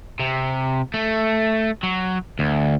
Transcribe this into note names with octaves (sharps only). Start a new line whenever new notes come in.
C3
A3
F#3
D2